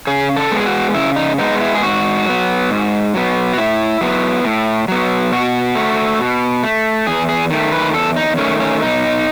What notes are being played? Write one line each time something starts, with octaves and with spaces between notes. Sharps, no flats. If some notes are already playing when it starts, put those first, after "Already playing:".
C#3 G#4
A4
G#3 B3
G#4
F#4
C#3 E4
D#4
G#3 B3 D#4
E4
G#4
G#2 F#4
F#3 B3
G#2
F#3 B3
F#4
A2 E4
F#3 B3
A2
F#3 B3
B2 F#4
A3
B2
A3
E2 G#4
G#4
D#3 A3
B4
E2 A4
D#4
D#3 A3 C#4
C#4
B2 D#4